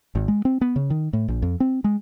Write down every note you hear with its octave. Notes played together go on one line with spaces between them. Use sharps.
G#1
G#3
C4
B3
C#3
D#3
A2
A#1
F2
C4
G#3